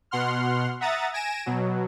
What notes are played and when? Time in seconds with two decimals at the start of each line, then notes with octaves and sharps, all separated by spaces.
0.11 B2 F#5 C6 F6
0.80 E5 F#5 A#5 D#6 A6
1.13 G#5 A#6 D7 E7
1.46 B2 F#3